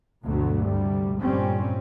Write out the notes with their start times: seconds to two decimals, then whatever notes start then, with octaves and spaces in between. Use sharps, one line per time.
0.25 D2 G2 B2 D3 F#3 A3
0.65 D2 C3 G3
1.21 G1 F2 A#2 G3 C4 C#4